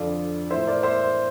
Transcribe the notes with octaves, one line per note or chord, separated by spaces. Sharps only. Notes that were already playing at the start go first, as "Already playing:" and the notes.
Already playing: F2 D3 F3 D5 F5
A2 E3 C5 E5
A#4 D5
C5 E5